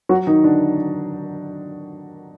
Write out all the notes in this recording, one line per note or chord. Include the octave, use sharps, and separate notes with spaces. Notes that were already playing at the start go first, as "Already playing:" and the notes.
F#3 F#4
D#3 D#4
D3 D4